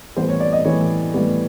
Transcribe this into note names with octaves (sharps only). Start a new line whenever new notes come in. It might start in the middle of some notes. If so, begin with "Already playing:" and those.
A2 E3 G3 B3 C5
C#5
D5
D#5
A2 E3 G3 B3 C#5
A2 E3 G3 B3